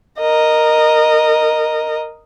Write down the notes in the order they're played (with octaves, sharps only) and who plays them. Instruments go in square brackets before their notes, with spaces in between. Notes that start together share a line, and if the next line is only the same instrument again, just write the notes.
[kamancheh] A#4 D#5